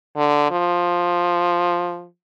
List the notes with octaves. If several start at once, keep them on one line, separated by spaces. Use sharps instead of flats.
D3
F3